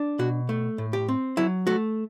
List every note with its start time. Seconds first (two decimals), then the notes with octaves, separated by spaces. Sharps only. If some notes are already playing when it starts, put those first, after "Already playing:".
Already playing: D4
0.19 B2 F#4
0.49 A3
0.78 A2
0.93 G4
1.08 C4
1.37 F#3 E4
1.67 A3 F#4